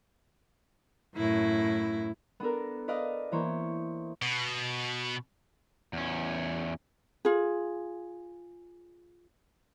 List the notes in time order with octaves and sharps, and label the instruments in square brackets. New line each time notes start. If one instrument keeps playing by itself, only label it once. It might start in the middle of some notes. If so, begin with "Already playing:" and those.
[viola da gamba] F#2 A2 E4
[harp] B3 D4 A4 A#4
B4 D5 D#5 F5
E3 A#3 C5 C#5
[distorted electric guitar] B2
[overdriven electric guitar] E2 C#4
[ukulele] F4 G#4